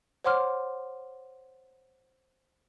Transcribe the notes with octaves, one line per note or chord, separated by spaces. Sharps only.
C5 C#5 F#5 C6 D6 F6